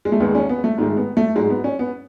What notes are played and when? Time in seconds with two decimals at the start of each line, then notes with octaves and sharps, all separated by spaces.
0.05 G#3
0.12 A3
0.20 D#2 D#3 G#3 B3
0.35 C#4
0.49 B3
0.64 A3
0.78 G#2 D#3 G#3 A3
0.97 B3
1.17 A3
1.35 G#2 F#3 G#3
1.50 B3
1.64 C#4
1.79 B3